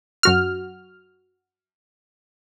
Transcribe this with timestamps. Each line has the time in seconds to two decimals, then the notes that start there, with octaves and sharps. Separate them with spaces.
0.23 F#2 F#4 F6